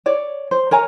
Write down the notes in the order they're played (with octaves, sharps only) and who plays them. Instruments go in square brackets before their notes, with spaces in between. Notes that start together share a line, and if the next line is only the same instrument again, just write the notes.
[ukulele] C#5 D5
C5
A#4 C#5 G#5 A#5